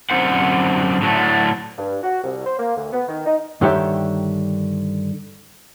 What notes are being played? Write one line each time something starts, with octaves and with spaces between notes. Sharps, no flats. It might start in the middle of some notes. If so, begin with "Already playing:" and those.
F#2 D3 C4 C5 F#5
A2 D3 F#3 A3
G2
F#4
C2
C5
A#3
D2
B3
D#3
D#4
G2 D3 D#3 G4 C#5 E5